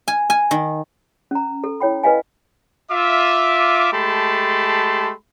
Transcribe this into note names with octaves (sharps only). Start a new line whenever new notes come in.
G#5
G#5
D#3
C#4 A#5
A4
E4 C#5 G5 B5
B4 D#5 F5 G#5
F4 E5 D6
G#3 A3 G4 A5 B5 C6